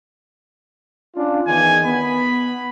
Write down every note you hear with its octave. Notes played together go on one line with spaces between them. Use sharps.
C#4 D4 F4
E2 D#3 G#5
B3 B5